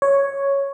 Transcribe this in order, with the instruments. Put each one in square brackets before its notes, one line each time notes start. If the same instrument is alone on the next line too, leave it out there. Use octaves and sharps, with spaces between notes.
[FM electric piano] C#5